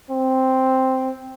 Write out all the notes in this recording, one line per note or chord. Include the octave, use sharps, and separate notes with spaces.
C4